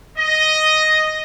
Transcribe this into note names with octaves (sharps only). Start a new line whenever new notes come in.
D#5